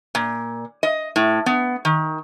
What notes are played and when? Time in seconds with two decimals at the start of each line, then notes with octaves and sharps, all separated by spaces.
0.15 A#2
0.83 D#5
1.16 A2
1.46 B3
1.85 D#3